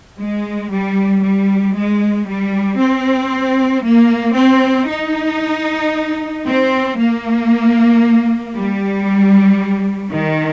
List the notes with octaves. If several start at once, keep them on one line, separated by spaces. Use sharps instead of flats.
G#3
G3
G3
G#3
G3
C4
A#3
C4
D#4
C4
A#3
G3
D#3